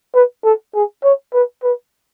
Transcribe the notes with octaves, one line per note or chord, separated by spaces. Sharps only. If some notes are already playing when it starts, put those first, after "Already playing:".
B4
A4
G#4
C#5
B4
B4